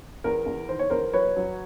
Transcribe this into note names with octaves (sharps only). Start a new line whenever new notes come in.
E2 A#4
E2
D#3 C5
C#5
E2 A#4 C5
F#3 B4 C#5
F#3